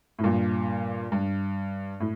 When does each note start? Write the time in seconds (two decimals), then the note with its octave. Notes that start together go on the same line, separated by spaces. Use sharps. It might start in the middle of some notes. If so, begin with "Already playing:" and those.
0.19 A2
0.24 G2 A#2
1.12 G2
2.00 A2